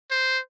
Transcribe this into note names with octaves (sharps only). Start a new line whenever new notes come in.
C5